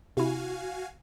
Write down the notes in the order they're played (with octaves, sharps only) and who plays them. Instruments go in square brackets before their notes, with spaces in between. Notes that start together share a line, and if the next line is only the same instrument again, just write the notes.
[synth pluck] C3 E4 [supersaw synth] F#4 F5 G#5